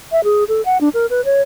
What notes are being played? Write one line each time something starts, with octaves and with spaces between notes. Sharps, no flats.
E5
G#4
A4
F#5
D4
A#4
B4
C#5